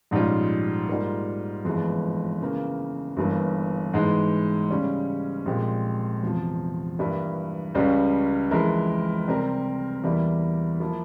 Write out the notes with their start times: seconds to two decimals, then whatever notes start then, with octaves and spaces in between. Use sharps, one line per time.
0.11 A#1 G#2 G3 C#4 F4
0.88 G#2 G3 A#3 F4
1.65 G1 F2 E3 G#3
2.41 C#3 E3 A#3
3.17 G1 G2 E3 A#3
3.93 G#2 E3 G#3
4.70 C#3 G3 C#4
5.46 A#1 A#2 G#3 C4 G4
6.23 E2 C3 F3
6.99 G2 E3 G3 A#3 E4
7.75 C#2 C#3 G3 C#4
8.51 F2 E3 G#3 E4 A#4
9.28 C3 G3 C4 G4 A#4
10.04 E2 E3 G3 A#3 E4
10.80 F3 A#3 E4